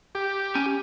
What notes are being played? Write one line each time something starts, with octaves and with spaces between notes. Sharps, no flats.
G4
C#4 G#5